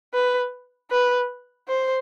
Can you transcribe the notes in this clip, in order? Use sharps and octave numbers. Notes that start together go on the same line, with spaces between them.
B4
B4
C5